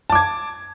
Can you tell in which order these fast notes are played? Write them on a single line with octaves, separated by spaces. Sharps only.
A5 D6 G#6